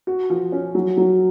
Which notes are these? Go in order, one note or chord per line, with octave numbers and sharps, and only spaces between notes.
F#4
F3
C#4
F#3
F#3